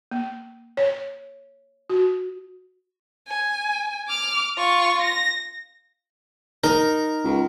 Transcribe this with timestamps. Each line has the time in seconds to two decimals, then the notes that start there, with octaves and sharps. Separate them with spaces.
0.11 A#3
0.77 C#5
1.90 F#4
3.28 G#5
4.08 D6 F6
4.57 F4 C#6
5.02 A#6
6.64 D#4 A#4
7.24 C#2